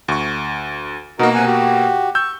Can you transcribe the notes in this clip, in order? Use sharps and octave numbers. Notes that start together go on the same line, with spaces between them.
D2 C#6
B2 A#3 D#4 F#4 A#4
C3 F#5 G#5
F#4 G4
C#6 E6 G6